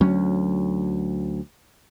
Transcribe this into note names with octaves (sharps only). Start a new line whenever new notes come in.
D2 F#3 C#4